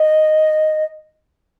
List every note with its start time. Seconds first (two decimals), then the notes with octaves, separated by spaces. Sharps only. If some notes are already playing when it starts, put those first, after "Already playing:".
Already playing: D#5